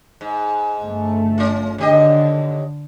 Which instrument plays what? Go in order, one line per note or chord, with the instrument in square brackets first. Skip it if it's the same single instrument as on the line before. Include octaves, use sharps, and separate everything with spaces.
[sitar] G#2
[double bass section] G1 A3
[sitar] C#4 F4
[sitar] D#2 G4 D#5 [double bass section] D3